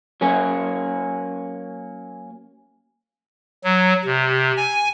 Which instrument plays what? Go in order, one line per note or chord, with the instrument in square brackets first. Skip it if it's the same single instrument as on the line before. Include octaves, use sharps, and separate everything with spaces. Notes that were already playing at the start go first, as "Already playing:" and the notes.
[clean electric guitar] F#3 A#3 C#4 G#4
[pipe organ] F#3
C3
G#5